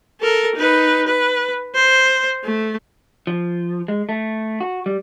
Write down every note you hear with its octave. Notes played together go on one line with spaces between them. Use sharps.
A4 A#4
D#4 B4
B4
C5
A3
F3
G#3
A3
F#4
G3